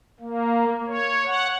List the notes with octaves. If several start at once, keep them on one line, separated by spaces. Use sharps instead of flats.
A#3
C#5
F#5